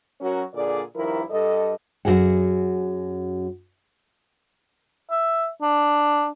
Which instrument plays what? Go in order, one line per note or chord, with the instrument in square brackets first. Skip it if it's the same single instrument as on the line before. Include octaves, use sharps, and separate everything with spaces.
[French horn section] F#3 C#4 F#4 A#4 C#5
A#2 D3 G#4 D5
G2 D#3 F3 E4 A#4
G2 A4 D#5
[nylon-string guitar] F#2 E3 F#4 G#4 F#5
[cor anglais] E5
D4